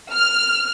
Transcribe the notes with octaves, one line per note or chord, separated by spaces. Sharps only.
F6